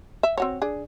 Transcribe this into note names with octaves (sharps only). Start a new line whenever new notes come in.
E5
C4 F#4 C#5
D4 G#4